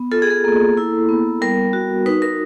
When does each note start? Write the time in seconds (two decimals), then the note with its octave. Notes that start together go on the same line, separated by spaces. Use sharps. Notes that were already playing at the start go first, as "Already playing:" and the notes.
Already playing: B3
0.12 F4 A4
0.22 G#4
0.30 A4
0.44 A#3
0.77 E4
1.09 B3
1.42 G3 A#4
1.73 F#4
2.06 D#4 B4
2.22 A#4